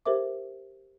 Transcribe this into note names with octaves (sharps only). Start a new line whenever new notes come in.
G4 A4 A#4 C5 E5 D6